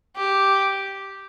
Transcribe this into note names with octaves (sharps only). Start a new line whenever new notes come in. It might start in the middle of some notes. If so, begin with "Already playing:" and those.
G4